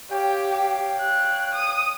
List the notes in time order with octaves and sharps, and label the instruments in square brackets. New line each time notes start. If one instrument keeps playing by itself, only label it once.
[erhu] G4 [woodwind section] C#5 F5 G5
[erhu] F#6
D#6